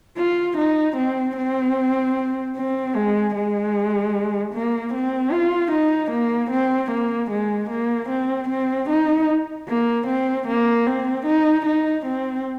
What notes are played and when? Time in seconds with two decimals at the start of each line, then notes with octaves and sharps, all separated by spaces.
0.18 F4
0.57 D#4
0.97 C4
1.37 C4
2.56 C4
2.95 G#3
3.35 G#3
4.54 A#3
4.94 C4
5.32 F4
5.72 D#4
6.11 A#3
6.51 C4
6.91 A#3
7.31 G#3
7.70 A#3
8.10 C4
8.49 C4
8.89 D#4
9.68 A#3
10.07 C4
10.48 A#3
10.86 C4
11.26 D#4
11.66 D#4
12.06 C4